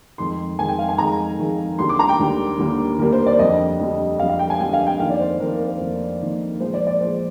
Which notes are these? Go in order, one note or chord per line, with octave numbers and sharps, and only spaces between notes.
F2 D#3 G#3 C6
F2 D#3 G#3 G#5
G5
F5
G#5
F2 D#3 G#3 A#5
F2 D#3 G#3
D#2 D3 G3 A#3 C6
D6
A#5
G5
D#2 D3 G3 A#3
D#2 D3 G3 A#3
D#2 D3 G3 A#3 A#4
C5
D5
F2 D3 G3 D#5
F2 D3 G3
F2 D3 G3 F5
F5
G5
G#5
F2 D3 G3 G5
F5
G5
F2 D#3 A#3 F5
D5
C5
F2 D#3 A#3 A#4
A#4
C5
F2 D#3 A#3
F2 D#3 A#3
A#2 F3 G#3 C5
D5
D5
A#2 F3 G#3 C5